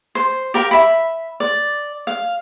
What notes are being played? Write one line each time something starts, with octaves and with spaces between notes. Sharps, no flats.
C5
G4 A#4 F5
E5 B5
D5
F5